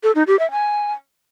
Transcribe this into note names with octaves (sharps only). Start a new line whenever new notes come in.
A4
D#4
G4
E5
G#5